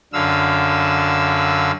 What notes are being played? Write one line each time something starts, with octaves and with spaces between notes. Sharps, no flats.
F#2 D3 F5 E6